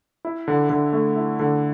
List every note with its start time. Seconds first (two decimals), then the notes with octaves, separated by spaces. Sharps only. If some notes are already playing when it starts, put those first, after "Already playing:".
0.25 E4
0.48 D3
0.70 D3
0.93 A3
1.16 E4
1.39 D3